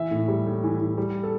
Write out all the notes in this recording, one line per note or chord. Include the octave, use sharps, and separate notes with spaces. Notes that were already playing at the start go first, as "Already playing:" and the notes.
Already playing: E3 E5
A2
G3
A2
E3
E3
G3
A4